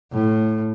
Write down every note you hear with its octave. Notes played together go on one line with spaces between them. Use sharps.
A2